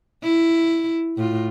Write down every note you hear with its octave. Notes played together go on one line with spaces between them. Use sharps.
E4
A2 F4